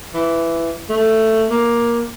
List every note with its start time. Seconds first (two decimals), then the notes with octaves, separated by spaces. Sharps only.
0.15 E3
0.90 A3
1.50 A#3